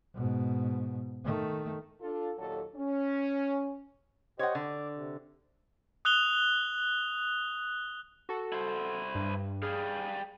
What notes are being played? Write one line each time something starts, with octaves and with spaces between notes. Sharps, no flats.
G#2 B2
D#3 A3
D4 F4 A4
D#2 A#2 F#3 A4
C#4
G4 C5 C#5 D#5 F#5
D3 D6
C3
D#6 F#6 F7 G7
F#4 A4
E4 C5
G2
G3 G#4 F5